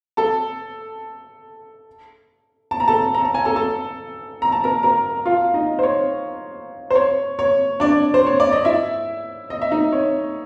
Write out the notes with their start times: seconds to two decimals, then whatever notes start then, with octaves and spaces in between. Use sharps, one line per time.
0.17 A4 A5
2.71 A5
2.80 A#5
2.88 A4 A5
3.15 A#5
3.25 A5
3.34 G#5
3.45 A4 A5
3.56 A4 A5
4.42 A#5
4.52 A5
4.64 A#4 A#5
4.83 A#4 A#5
5.26 F4 F5
5.54 D#4 D#5
5.79 C5
5.83 C#5
6.90 C5
6.95 C#5
7.39 C#5
7.80 D4 D5
8.14 C5
8.26 C#5
8.40 D5
8.52 D#5
8.65 E4 E5
9.50 D#5
9.62 E5
9.72 D#4 D#5
9.93 C#5